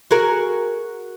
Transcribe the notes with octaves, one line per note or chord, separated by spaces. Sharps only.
F#4 G#4 A#4